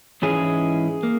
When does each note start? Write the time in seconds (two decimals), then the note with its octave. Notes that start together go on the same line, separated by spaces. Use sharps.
0.22 G#2 E3 G#3 C#4 E4 G#4
1.03 A#3